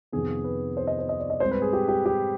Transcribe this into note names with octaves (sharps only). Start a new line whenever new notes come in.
F2 C3 D#3 B3 G#4
B4
C5
D#5
C5
D#5
D5
D#5
G#2 G3 C4 C5
B4
G#4
G4
G4
G4